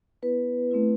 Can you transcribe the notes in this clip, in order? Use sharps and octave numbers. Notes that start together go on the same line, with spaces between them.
B3 E4 B4
A3 C4 E4